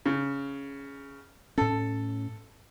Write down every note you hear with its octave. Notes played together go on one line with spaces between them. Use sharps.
C#3
A2 C#4 A4